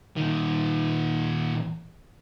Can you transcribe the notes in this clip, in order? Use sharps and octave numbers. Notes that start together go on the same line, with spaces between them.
A#2 D#3